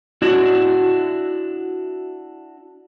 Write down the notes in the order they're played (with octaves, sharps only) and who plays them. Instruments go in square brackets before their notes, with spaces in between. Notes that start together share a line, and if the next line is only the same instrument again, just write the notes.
[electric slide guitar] D4 E4 F#4